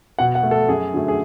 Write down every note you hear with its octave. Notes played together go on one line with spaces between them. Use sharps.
B2 F#5
F#5
A3
A4
F#2 G#4
D3 F#3 A3
G#4